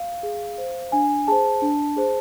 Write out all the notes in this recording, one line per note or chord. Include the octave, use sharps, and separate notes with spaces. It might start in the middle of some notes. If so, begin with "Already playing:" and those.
Already playing: F5
G#4
C5
D4 G#5
G#4 C5 A5
D4
G#4 C5